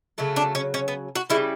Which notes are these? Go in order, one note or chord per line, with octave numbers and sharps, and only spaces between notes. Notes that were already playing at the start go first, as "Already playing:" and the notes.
C#3 F#3 A3
D4
C#4
C#4
B3
F#4
C#3 E3 G3 E4